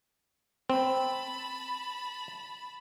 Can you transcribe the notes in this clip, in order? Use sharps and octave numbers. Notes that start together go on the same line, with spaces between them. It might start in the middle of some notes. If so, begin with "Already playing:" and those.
C4 A5 B5